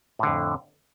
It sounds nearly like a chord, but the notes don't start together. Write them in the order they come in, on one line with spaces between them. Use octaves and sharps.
A2 D3 F2